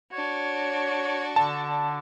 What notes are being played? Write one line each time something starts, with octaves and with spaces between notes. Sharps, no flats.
D4 F#4 C#5
D3 A5